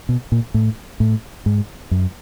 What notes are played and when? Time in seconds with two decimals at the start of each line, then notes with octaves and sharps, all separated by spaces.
0.09 B2
0.32 A#2
0.54 A2
1.00 A2
1.46 G#2
1.91 F#2